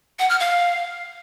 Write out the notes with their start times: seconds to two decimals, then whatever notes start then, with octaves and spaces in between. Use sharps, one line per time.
0.19 F#5
0.30 F6
0.40 F5